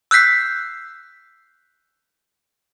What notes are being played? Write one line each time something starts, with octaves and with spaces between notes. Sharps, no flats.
E6 F#6 G6 B6 C7